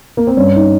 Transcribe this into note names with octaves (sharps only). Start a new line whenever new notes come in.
A#3
C4
G2 C#4
D#4